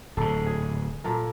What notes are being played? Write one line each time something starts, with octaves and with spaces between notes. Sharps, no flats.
D1 G#2 A4
G#4
A#2 A4 A#4